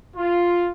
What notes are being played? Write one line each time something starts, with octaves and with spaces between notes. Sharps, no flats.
F4